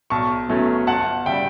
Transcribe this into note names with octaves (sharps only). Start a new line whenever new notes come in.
B1 A5 C#6
B2 F#3 A3 C#4
G1 F#5 A5
C#3 G3 E5 G5